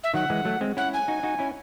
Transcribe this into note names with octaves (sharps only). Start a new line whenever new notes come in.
E5
D#3 F#3 F#5
E3 G#3
F#3 A3
G#3 C4
C#4 E4 F#5
G#5
D#4 F#4
D#4 F#4
C#4 E4